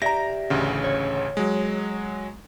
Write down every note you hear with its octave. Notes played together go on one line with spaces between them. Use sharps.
G4 D5 E5 A#5 A#6
A1 D2 C#3
C#5
F#3 G#3